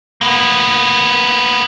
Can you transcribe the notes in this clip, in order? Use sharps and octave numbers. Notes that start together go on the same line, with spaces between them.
A#3 B3